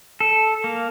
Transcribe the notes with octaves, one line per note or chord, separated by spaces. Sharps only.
A4
A#3